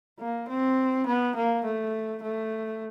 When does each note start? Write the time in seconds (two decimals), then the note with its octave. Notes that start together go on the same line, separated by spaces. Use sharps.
0.20 A#3
0.49 C4
1.07 B3
1.35 A#3
1.64 A3
2.23 A3